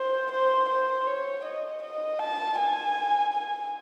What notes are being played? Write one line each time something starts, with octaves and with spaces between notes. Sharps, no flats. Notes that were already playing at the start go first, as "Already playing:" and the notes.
Already playing: C5
C5
C5
C#5
D#5
D#5
A5
G#5
G#5